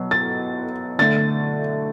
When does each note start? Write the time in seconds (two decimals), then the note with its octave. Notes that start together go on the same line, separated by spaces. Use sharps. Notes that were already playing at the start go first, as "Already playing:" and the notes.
Already playing: B2 F#3 B3
0.11 A6
0.99 D3 A3 A6